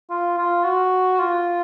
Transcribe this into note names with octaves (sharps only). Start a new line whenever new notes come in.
F4
F4
F#4
F4